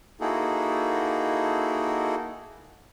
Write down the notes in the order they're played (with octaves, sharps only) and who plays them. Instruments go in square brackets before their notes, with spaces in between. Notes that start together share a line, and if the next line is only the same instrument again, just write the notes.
[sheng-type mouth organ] A#3 D#4 E4 F#4 G#4 A4